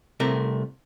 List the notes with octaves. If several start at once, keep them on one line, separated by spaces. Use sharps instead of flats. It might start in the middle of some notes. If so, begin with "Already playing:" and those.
C2 C3 A3 A#4